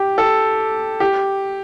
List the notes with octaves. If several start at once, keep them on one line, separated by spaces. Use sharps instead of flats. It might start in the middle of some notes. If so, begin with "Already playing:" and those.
Already playing: G4
A4
G4